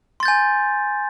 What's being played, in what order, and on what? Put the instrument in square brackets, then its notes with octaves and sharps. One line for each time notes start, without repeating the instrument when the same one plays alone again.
[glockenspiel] C6
A6
G6
G#5